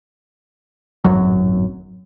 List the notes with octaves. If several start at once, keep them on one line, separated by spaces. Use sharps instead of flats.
D1 G#1 F#2 F#3